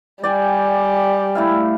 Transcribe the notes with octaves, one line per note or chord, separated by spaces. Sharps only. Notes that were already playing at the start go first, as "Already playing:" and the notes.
G3 D5 G5 G#5
A3 E4 F5